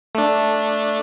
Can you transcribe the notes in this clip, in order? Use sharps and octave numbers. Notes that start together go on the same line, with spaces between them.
A3 D4